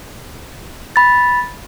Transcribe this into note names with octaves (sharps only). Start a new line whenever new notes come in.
B5 A6